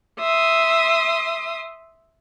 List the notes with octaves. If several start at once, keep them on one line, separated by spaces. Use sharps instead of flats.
E5 C6 D#6